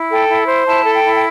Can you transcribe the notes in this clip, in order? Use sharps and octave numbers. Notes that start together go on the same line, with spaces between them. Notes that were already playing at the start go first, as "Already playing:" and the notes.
Already playing: E4
A4 G5
E4
C5
E4 A5
A4
G5
E4
G5